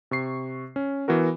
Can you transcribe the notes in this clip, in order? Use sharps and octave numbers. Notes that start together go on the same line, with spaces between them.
C3 C#6 C7
C#4
E3 B3 F#4 A#4